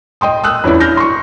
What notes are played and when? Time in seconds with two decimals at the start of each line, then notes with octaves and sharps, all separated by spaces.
0.21 D#5 G5 C6 D#6
0.44 D#6 E6 F#6
0.64 E2 C#4 D4 E4
0.80 F6 G6 A#6
0.97 C6 C#6